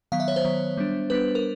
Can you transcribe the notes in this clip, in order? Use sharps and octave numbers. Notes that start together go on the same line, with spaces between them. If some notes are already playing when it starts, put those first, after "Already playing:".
D#3 F#3 B3 F5
E5
C#5
C5
D#3 F#3 B3
G3 B3 D4
G3 B3 D4 B4
A#4